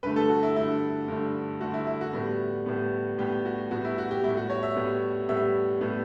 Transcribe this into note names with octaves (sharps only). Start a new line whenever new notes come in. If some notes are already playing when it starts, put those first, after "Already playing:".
G2 D3 A3 B4
A4
F#4
E4
G2 D3 A3 E4
G2 D3 A3
G2 D3 A3 F#4
E4
E4
F#4
A2 G3 B3
A2 G3 B3
A2 G3 B3 G4
F#4
A2 G3 B3 F#4
E4
F#4
G4
A2 G3 B3 E4
F#4
C#5
E5
A2 G3 B3
A2 G3 B3 E5
A2 G3 B3